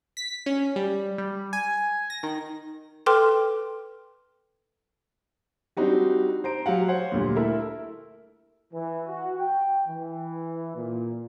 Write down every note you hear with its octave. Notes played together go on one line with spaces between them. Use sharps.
B6
C#4
G3
G3
G#5
A#6
D#3
A4 B4 G5 C6 D6 F6
G3 C4 D4 D#4 F#4 G4
C5 A#5 D7
F#3 G4 F5 F#5
C5 C#5 F#5
D2 A#2 G3
E4 A4 A#4 E5
E3
F#4
G5
E3
A#2